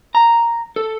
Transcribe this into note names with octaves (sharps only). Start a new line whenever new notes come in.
A#5
A4